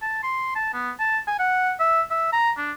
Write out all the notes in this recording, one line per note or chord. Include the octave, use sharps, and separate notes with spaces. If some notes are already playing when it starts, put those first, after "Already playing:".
A5
C6
A5
B3
A5
G#5
F#5
E5
E5
A#5
D4